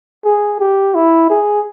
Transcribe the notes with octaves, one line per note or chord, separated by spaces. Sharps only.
G#4
G4
E4
G#4